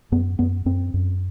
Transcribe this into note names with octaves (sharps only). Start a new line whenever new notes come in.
F#2 B3
F#2 B3
F#2 C4
F#2